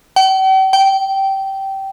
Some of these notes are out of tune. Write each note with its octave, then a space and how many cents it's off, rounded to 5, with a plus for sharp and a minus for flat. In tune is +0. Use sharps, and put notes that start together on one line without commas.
G5 -45
G5 -15